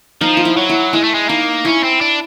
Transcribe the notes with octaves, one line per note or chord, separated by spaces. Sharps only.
F3 D#4
F4
E4
F#3
E4
G#3 E4
A3
G#3
A#3 D#4
C#4 E4
C4
D4